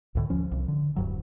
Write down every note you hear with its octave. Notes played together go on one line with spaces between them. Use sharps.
C#2 A2 D3
D#2 F3 C#4
C2
D3
D1 G2 F#3